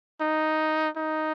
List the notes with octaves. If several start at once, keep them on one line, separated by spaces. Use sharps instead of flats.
D#4
D#4